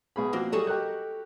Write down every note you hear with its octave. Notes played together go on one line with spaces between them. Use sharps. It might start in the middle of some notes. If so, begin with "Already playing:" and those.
B1 G#4 B5
F3 A#3 C4 F#4
F#3 G3 F#4 G#4 A4 D#5
G4 A#4 F#6